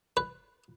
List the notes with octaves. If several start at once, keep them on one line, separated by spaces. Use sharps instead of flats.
B4